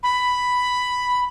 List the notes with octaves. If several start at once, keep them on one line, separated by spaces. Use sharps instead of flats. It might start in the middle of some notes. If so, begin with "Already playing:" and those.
B5